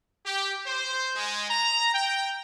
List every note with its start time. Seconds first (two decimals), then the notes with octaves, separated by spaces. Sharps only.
0.24 G4
0.66 C5
1.15 G#3
1.49 A#5
1.94 G5